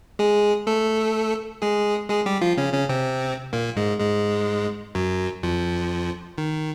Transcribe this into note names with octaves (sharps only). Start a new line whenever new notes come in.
G#3 G#4
A3 A4
G#3 G#4
G#3 G#4
G3 G4
F3 F4
C#3 C#4
C#3 C#4
C3 C4
A#2 A#3
G#2 G#3
G#2 G#3
F#2 F#3
F2 F3
D#3